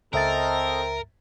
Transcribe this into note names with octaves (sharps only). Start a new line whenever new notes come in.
C#2 C4 A4 A#4 D#5 E5 A#5 A6